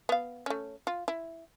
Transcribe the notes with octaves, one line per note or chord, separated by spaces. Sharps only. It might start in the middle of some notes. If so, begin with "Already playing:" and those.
B3 F5
A3 C#4
F4
E4